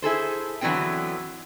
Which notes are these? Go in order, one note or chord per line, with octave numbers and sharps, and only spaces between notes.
E4 G#4 A4 C5
D3 E3 F#3 B3 C4 G5